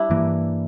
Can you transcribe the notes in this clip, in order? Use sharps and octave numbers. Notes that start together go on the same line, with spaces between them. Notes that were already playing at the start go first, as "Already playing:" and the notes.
Already playing: G3 D4 E4
G2 E3 A#3